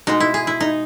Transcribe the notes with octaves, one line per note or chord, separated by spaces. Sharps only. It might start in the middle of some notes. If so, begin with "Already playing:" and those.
B2 G#3 D#4
E4
G#4
E4
D#4